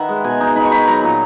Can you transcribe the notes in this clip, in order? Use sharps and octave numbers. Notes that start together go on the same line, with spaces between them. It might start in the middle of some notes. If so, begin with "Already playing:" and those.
Already playing: D#3 B4 E5 F#5
G#3
B2 G#5
D#4
D#4 B5
C#6
D#4 B5
F#3 A#5
A#2